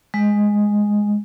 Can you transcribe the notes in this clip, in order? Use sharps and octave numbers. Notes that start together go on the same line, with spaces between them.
G#3